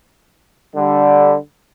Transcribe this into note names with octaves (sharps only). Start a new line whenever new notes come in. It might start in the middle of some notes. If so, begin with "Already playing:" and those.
D3 G3